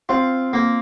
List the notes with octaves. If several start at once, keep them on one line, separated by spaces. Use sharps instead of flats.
C4 F4
A#3